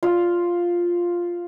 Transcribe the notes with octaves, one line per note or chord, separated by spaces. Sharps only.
F4